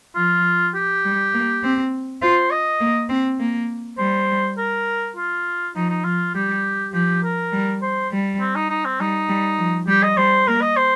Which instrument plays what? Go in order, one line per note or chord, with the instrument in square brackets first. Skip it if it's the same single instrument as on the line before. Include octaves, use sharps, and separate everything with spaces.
[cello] F3 [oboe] F4
[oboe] G4
[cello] G3
A#3
C4
[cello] F4 [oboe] C5
[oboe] D#5
[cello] A#3
C4
A#3
[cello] G3 [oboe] C5
[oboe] A#4
F4
[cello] F3 [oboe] D#4
[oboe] D#4
[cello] F3 [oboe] F4
[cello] G3 [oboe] G4
[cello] F3 [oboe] G4
[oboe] A#4
[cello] G3
[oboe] C5
[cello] G3
[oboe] C4
D#4
D#4
C4
[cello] G3 [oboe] D#4
[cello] G3
F3
[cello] G3 [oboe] G4
[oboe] D#5
[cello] G3 [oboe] C5
[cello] A#3 [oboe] A#4
[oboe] D#5
C5